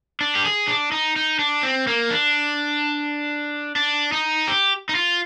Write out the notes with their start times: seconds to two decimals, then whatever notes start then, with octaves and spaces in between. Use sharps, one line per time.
0.21 D4
0.35 G4
0.45 G#4
0.68 D4
0.92 D#4
1.16 D#4
1.39 D4
1.63 C4
1.87 A#3
2.10 D4
3.76 D4
4.12 D#4
4.47 G4
4.89 D#4
4.95 F4